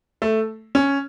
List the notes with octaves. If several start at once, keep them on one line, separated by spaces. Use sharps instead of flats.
A3
C#4